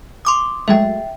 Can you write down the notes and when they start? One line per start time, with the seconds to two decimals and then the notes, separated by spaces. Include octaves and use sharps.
0.25 C6 D6 D#6
0.68 F#3 G#3 A3 E5 G5